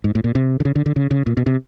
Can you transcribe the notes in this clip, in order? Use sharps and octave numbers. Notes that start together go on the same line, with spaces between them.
G#2
A2
A#2
C3
D3
C#3
D3
D3
C#3
C#3
A#2
B2
C3